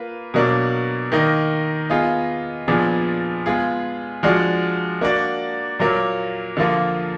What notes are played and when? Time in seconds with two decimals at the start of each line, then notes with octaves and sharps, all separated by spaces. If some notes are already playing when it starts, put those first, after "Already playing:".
Already playing: A#3 F4 B4
0.34 B2 F#3 A#3 D4
1.12 D#3 A#3 D#4
1.90 B3 F4 G#4 D#5
2.68 A#2 F3 B3 D4 G#4
3.46 G#3 B3 F4 G#4
4.23 F3 G#3 D4 F#4 D5
5.01 A#3 D4 F#4 D5
5.79 A#2 F#3 A#3
6.57 D3 F3 A#3 F4